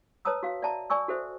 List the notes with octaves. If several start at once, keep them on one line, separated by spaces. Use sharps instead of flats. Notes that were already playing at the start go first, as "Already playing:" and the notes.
B4 C#5 A5 A#5 D#6 E6
F#4 F5
D5 E5 A5 A#5
D5 G#5 C#6 E6
F#4 A4 C5 E5